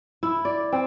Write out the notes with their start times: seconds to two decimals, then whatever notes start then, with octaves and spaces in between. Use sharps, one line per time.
0.23 E4
0.45 D5
0.72 C4